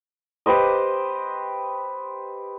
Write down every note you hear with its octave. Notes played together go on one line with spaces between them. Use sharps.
G4 B4 C5 D#5